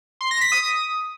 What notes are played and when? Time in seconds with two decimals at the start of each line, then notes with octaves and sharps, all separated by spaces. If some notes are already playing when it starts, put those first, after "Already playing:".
0.21 C6
0.31 A#6
0.41 B6
0.52 D#6